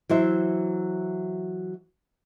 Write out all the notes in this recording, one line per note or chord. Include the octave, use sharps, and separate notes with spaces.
E3 F#3 C5 E5